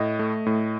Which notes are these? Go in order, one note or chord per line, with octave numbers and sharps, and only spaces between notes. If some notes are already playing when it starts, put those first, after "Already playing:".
Already playing: A2 D#5
A3
A2